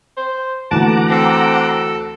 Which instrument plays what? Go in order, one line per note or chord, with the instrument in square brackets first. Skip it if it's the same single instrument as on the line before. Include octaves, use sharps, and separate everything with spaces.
[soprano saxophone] C5
[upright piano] D2 E3 A3 [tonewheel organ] F#5 A#5 D6 [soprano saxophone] A5
[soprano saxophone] C4 [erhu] A4